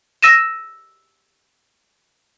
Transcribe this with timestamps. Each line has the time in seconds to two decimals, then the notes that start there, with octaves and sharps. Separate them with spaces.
0.22 E6 A#6 D#7 E7